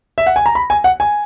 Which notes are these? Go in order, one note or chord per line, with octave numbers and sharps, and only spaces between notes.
E5
F#5
G#5
A#5
B5
G#5
F#5
G#5